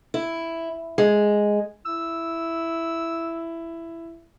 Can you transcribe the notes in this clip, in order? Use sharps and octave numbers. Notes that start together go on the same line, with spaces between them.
E4
G#3
E4 E6